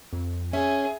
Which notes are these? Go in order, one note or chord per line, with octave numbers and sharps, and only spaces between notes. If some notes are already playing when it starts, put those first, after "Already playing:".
F2
C#4 G#4 E5